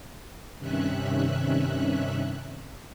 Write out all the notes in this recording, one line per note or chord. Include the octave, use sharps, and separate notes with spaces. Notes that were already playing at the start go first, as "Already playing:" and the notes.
G2 C3 D#3 C#4 E5 F#6